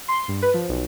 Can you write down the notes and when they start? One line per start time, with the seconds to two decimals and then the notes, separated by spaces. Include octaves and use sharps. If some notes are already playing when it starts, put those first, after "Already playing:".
0.08 C6
0.28 G2
0.42 B4
0.54 F3
0.69 B1